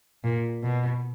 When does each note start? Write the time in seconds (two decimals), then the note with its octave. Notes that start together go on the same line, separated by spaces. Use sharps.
0.24 A#2
0.63 B2